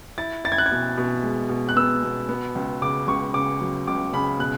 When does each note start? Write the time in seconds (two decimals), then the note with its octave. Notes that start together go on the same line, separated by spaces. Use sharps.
0.18 E4 A6
0.45 E4 A6
0.52 G#6
0.58 F#6
0.66 G#6
0.71 B2
0.97 B2
1.23 G#3
1.49 B2
1.69 F#6
1.76 B3 E6
2.02 B2
2.29 B3
2.55 C#2
2.82 C#3 D6
3.07 C#2 C#6
3.34 C#3 D6
3.61 F#3
3.87 C#2 D6
4.13 C#3 B5
4.39 B2 F#6